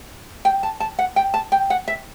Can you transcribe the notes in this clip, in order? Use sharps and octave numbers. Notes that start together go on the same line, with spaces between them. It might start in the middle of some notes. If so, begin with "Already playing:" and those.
G5
A5
A5
F#5
G5
A5
G5
F#5
E5